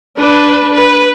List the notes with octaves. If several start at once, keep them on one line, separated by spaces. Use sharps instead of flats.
D4 B4
B4